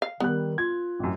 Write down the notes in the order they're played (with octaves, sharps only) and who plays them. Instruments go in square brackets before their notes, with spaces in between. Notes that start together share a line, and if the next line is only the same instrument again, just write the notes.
[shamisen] F5
[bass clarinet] D#3 [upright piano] G3 F#6 [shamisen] B3
[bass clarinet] F4 [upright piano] G#6
[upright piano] A1 F#2